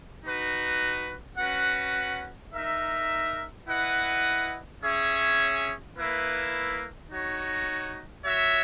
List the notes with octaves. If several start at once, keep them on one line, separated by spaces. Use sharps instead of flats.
D#4 F#4 B4
C#4 F#4 B4 F#5
D#4 A#4 E5
E4 B4 D#5 F#5
C#4 G#4 C#5 E5
A#3 E4 B4 E5
D#4 F#4 C#5
F#4 C#5 E5